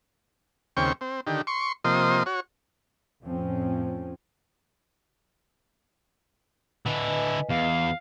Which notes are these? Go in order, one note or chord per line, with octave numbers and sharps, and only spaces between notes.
D#2 C#3 C4 G5 C#6
C4
D3 D#3 G4
C6 C#6
C3 F3 A#3 D#5 C6
F#4 C#5
F2 A2 F3 C4 C#4
D3 E4 B4 D#5 G#5
E2 F5